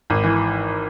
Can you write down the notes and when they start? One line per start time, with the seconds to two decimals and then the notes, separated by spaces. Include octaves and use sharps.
0.10 G#1
0.24 E3